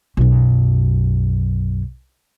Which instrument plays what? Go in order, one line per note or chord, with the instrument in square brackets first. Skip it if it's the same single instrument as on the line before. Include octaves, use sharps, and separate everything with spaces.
[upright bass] B1 F#2